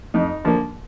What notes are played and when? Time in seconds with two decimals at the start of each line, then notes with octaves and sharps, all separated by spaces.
0.14 F2 D#4
0.44 D3 F3 A#3